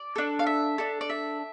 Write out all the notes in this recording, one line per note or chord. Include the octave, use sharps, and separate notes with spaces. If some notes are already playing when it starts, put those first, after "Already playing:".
Already playing: D5
D4 A4
F5
E5
D4 A4
D5
E5